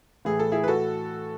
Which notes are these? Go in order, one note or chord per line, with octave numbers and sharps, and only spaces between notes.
A2 E3 A3 G#4
A4
E4 G#4
B4
F#4 A4